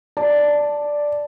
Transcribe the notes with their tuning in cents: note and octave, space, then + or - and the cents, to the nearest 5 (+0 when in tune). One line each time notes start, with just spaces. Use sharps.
D5 +0 A5 +0